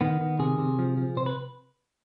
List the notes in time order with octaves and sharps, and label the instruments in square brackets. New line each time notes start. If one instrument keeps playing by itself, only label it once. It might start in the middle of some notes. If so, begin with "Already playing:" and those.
[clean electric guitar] D#3 B3
D#3
C3 G#4
C3
F3
F3
C3 C5
B4